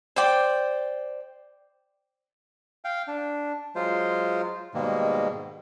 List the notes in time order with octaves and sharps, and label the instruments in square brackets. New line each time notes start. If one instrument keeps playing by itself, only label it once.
[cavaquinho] C5 D5 G5
[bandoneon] F5 G5
D4
F#3 G#3 F4 C5
G#2 B2 D#3 G3 G#3 A#3